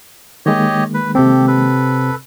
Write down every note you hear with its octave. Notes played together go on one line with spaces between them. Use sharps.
D#3 G#3 A#3 G4 C#5 D#5
B4
C3 C4 G4 A4
A4 B4